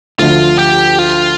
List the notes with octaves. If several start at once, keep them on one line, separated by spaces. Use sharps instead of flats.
D2 D3 F3 A3 D4 F4
G4
F4